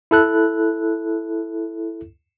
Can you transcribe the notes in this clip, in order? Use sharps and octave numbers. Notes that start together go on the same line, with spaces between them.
E4 A4 F#6